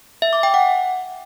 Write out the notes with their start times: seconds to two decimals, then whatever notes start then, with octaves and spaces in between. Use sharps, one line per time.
0.22 E5
0.33 D6
0.43 G5
0.54 F#5